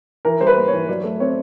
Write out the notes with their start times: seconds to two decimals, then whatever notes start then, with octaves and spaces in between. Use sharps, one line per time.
0.25 E3 A#4
0.41 G3 C5
0.47 B4
0.57 A#3
0.68 E3 C#5
0.88 F#3 D5
1.04 A3
1.20 C4 C#5